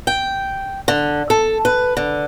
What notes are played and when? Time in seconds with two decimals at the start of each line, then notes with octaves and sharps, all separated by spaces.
0.07 G5
0.88 D3
1.30 A4
1.65 B4
1.97 D3